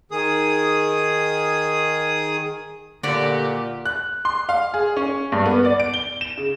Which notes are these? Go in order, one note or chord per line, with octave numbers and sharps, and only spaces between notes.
D#3 G#4 D#6
A#2 D3 F#4 G4 D5
F#6
C6
F5
G#4
C#4
G2
B3
D5
D7
G7
E7
C#3